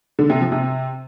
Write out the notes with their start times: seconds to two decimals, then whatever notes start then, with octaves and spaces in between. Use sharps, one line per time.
0.19 D3
0.30 C3
0.41 F3
0.52 C3